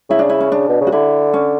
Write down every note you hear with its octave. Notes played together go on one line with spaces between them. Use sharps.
C#3 E4
D4
E4
C#4
D4
B2
C#3
F#4
D3 E4
C#4